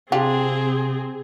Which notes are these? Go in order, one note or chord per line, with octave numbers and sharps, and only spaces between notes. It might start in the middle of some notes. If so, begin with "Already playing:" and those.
C3 C4 D4 F4 G4 G#4